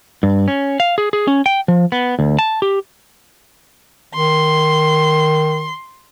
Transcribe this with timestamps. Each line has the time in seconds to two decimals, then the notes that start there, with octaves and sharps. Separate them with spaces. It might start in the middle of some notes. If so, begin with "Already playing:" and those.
0.23 G2
0.48 C#4
0.80 F5
0.98 G#4
1.13 G#4
1.27 C#4
1.46 G5
1.68 F3
1.92 B3
2.19 D2
2.39 A5
2.62 G4
4.14 D#3 C6